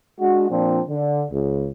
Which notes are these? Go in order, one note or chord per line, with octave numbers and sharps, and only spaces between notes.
G#3 D4 F#4
A#2 F3 C4 D4
D3
C#2